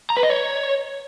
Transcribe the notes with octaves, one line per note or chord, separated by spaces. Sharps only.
A#5
B4
D#5
C#5